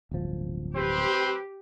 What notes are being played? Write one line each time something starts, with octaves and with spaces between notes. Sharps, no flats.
D1 G1 F3
C4 G4 B4 C5